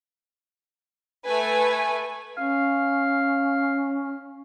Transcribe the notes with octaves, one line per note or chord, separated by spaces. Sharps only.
A3 B4 G#5
C#4 F5